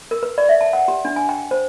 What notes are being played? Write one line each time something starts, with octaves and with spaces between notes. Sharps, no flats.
A#4
B4
D5
E5
A5
F#5
G4
D4
G#5
G5
C5